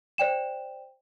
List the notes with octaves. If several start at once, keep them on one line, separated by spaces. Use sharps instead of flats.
C5 D5 G5 E7